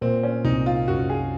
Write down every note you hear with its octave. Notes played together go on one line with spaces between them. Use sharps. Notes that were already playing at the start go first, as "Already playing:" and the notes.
A#2 C4
C#4
C2 D#4
F4
F#2 F#4
G#4